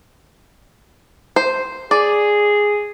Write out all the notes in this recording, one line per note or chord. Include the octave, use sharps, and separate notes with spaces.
C5
G#4 D5